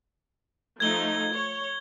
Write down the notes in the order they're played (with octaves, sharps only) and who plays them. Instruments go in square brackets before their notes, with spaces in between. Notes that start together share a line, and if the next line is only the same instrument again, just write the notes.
[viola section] F3 A3 D#4 [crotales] G#6 G7
[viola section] C#5